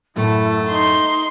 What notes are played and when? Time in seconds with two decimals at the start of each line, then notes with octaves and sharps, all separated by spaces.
0.16 F#2 A2 F#3 A3 E4
0.69 D#4 C6